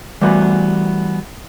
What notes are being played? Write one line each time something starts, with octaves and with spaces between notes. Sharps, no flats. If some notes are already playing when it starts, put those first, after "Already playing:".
E3 G3 A3 B3 F#4